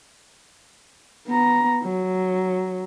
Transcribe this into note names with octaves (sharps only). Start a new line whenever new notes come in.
B3 A#5
F#3